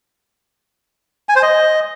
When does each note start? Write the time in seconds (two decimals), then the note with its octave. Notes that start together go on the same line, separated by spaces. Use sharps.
1.29 G#5
1.36 C5
1.43 D#5